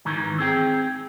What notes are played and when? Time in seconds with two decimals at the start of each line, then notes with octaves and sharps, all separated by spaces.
0.05 G#2 D#3 E3
0.38 C4 G#4 G5